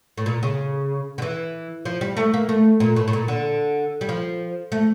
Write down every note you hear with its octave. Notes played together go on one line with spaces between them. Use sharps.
A2
A#2
C#3
D3
E3
F3
G3
A3
A#3
A3
A#2
A2
A2
A#2
D3
G3
F3
A3